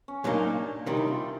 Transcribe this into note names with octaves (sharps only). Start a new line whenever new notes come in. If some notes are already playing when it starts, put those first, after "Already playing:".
C#4
A#2 F#3 A#3 D4 D#4
C3 D#3 G3 D#4
E4
F4